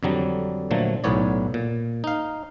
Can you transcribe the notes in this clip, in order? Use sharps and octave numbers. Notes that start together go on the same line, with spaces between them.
F2 D3 F#3 G3
A#2 D3 F3 F#3 A3
B1 A2 B3 C#5 D5
A#2
D#4 F5